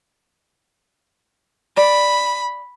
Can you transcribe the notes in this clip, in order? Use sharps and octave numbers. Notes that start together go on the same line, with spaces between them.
D5 B5